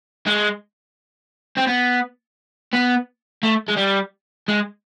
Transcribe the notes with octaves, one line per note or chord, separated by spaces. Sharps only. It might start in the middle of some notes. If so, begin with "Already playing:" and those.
G#3
C4
B3
B3
A3
G#3
G3
G#3